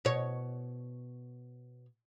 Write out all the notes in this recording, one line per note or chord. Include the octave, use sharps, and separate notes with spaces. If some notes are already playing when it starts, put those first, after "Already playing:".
B2 C#5